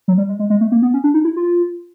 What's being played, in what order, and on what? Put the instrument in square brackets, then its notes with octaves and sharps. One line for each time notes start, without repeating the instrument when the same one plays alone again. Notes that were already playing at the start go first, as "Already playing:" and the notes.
[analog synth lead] F#3
G3
G#3
G#3
G#3
A3
A#3
B3
C#4
D4
D#4
E4
F4